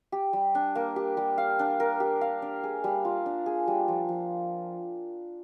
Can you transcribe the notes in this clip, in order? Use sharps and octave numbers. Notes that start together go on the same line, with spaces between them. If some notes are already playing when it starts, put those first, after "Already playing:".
G4
G3
D4
A#3
G4
G3
F5
D4
A#4
G4
F5
D4
G#4
G3
F4
D4
G#4
G3
F3
F3